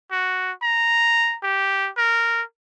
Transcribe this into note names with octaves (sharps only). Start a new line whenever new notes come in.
F#4
A#5
G4
A#4